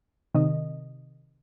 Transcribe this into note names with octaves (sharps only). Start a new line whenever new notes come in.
C3 D#3 D#5